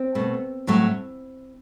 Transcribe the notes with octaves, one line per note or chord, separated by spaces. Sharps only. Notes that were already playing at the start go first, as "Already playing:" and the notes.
Already playing: C4
B2 A3
A2 F#3 A3